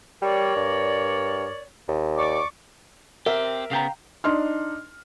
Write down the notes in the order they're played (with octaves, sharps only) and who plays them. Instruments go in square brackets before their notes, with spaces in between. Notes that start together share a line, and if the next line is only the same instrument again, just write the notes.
[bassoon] G3 [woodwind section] A#4 C#5 D5
[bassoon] G2
D#2
[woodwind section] D5 C#6 D6
[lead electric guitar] C4 G4 [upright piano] A#4 E5
[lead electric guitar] C#3 B3 [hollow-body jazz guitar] F5 G5 A#5
[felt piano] D4 D#4 C6 F6